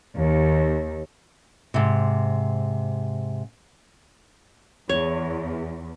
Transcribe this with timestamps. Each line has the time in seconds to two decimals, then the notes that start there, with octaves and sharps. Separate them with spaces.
0.15 D#2
1.74 G#2 C3
4.89 E2 C#5